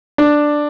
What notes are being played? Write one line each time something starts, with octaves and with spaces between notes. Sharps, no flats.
D4